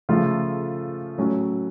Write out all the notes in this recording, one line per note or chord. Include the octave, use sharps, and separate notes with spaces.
C#3 F3 A3 F4 A4
A2 F#3 C#4